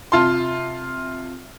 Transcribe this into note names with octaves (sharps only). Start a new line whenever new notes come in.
C3 F4 A5 C6